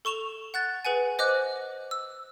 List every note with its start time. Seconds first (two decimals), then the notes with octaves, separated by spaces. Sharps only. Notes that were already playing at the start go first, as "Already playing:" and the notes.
0.05 A4 C#6 E7 F7 G7
0.54 F#5 F#6 A6
0.85 G#4 B4 F#5 G#5
1.19 C5 D#5 D6 F#6
1.91 E6